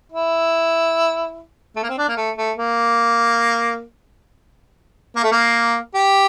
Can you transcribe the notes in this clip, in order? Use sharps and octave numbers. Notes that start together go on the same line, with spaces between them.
E4
A3
A#3
C4
D4
A#3
A3
A3
A#3
A#3
A3
A#3
G4